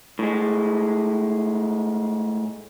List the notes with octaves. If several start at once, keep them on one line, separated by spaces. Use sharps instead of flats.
A2 G#3